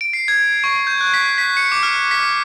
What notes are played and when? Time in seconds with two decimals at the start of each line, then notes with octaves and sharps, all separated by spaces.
0.01 D7
0.13 C7
0.28 G#6
0.64 C#6
0.87 G6
1.01 F#6
1.14 B6
1.38 B6
1.57 C#7
1.72 D6
1.83 F6
2.11 B6